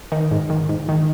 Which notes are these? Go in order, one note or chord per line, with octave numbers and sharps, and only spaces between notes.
D#3
G#2
D#3
G#2
D#3